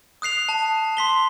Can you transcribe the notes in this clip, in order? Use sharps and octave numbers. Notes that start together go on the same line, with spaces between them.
D#6 F#6 C7 F7
A5
C6 B6 G7